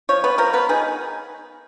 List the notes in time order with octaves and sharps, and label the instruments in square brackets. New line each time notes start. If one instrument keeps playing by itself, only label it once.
[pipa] F3 C#5
B3 B4
F3 A#4
B3 B4
D#3 G#4